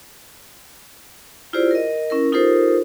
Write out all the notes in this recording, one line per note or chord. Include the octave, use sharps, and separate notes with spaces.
E4 F4 G4 G#4 C5 D5
A#4 D#5
C#4 E4 A#4
D#4 F4 G4 A4 A#4 C5